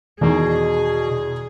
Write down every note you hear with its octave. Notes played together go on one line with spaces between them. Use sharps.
E2 B2 D#3 G#4